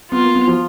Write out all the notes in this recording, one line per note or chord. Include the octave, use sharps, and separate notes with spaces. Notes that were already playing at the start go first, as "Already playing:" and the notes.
B3 F4
A#3
B3
F3